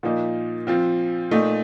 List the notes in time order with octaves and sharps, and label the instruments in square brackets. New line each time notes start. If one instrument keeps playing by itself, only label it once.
[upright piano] A#2 F3 A#3 D#4
F3 C4 F4
A#2 A3 D#4